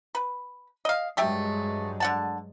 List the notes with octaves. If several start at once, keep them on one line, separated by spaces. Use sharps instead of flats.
B4
D#5 F5
G2 F#3 G#3 A3 G4 E5
D3 F#5 A5